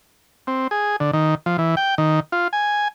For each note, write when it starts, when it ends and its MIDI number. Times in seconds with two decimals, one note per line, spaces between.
0.47 0.67 60
0.71 0.96 68
1.00 1.11 50
1.13 1.35 51
1.46 1.57 53
1.58 1.75 52
1.77 1.95 79
1.98 2.20 51
2.32 2.48 65
2.53 2.88 80